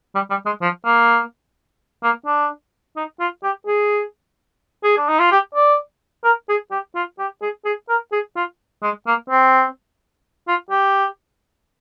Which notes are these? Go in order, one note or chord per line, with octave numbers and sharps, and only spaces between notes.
G3
G3
G#3
F3
A#3
A#3
D4
D#4
F4
G4
G#4
G#4
D4
D#4
F4
G4
D5
A#4
G#4
G4
F4
G4
G#4
G#4
A#4
G#4
F4
G#3
A#3
C4
F4
G4